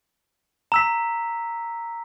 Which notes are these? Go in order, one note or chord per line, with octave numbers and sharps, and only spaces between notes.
A#5 E6 B6